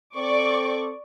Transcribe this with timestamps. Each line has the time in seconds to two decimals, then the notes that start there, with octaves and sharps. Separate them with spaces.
0.15 C4 A4 D5 C#6 D6